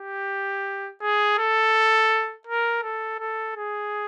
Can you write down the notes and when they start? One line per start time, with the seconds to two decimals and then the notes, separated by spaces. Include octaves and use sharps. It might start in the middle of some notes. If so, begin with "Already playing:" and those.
Already playing: G4
1.02 G#4
1.38 A4
2.47 A#4
2.83 A4
3.19 A4
3.56 G#4